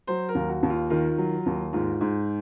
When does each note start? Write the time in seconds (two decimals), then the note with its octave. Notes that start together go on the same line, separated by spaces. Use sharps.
0.07 F#3 C5
0.29 A#4
0.35 D#2
0.49 F#4
0.63 D#2
0.70 F4
0.90 D#3 F4
1.18 F#3
1.46 D#2
1.73 G#2 F4
2.01 G#2